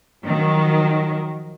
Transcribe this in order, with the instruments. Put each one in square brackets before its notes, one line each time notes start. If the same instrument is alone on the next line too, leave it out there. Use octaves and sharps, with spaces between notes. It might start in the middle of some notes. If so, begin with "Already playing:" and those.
[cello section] D#3 F3 F#3